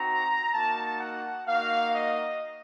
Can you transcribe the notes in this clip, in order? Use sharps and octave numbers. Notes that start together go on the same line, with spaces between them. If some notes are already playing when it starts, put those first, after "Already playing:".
Already playing: C4 D#4 F#4 A#5
A#3 D#4 F#4 A5
F#5
A#3 D#4 F#4 F5
D#5